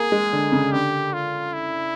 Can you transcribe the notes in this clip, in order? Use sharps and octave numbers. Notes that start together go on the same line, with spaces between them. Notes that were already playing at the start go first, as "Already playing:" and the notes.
Already playing: A#3 G#4
G#3
D3
C#3
D3 G4
F4
E4